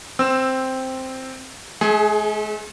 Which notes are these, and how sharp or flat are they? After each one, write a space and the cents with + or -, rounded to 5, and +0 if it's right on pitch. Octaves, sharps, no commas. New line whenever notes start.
C4 +0 E6 +0
G#3 +45 G#4 +10